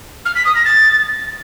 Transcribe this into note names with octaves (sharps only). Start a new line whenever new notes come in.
F6
B6
D#6
A#6
A6